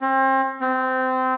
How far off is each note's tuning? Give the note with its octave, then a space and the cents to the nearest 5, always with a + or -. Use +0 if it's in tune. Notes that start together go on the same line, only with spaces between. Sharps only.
C4 +35
C4 -20